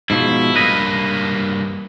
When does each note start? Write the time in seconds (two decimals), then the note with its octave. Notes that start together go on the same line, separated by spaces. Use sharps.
0.10 G#2 B2 F3 E4
0.55 G2 A#3 B4 D#5